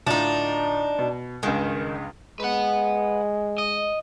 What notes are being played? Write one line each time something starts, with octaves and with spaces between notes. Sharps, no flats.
A2 D3 D4 D#4 F4
B2
C#2 G2 D#3 G#3
G#3 B4 F#5
D#5